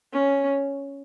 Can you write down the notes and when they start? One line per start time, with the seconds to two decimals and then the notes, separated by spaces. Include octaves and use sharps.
0.13 C#4